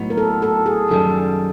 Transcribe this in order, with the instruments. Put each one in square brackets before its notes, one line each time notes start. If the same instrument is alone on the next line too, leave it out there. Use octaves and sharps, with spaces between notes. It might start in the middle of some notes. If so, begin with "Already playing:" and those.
Already playing: [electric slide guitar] A2 F#3 B3 D#4
[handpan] A#4
A4
A4
G#4
[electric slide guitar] F#2 D#3 G3 [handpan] A4